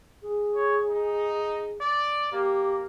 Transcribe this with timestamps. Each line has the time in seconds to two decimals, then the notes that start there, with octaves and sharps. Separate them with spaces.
0.22 G#4
0.55 C#5
0.89 D#4
1.81 D5
2.32 A#3 G4